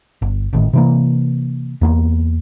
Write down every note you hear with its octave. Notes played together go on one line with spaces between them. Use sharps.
G1
G#1 A2 D#3
C3 E3 A#3
E2 A#3 B3